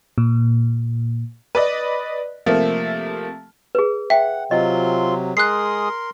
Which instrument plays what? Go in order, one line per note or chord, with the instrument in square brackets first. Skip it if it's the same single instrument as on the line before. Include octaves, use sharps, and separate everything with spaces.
[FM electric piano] A#2
[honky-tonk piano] B4 D5 D#5
C3 F3 A3 A#3
[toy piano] G#4 B4
[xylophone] E5 [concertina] F#5 [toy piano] G5
[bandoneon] C3 F#3 [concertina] C4 F4 C6 [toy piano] D#5
[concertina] G#3 G#4 D#6 [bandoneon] A#4 C6 [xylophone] F#6 C7